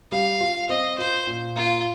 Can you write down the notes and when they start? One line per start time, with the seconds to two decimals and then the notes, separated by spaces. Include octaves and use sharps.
0.12 G3 F5
0.41 F4
0.69 C4 D#5
0.98 F4 C5
1.27 A#2
1.56 A#3 F4